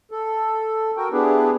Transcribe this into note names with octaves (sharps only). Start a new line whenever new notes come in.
A4
F#4 A#4 G5
B3 D4 E4 G4 G#4 B4